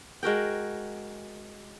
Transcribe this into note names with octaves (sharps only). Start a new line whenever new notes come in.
G#3 F#4 A#4 G5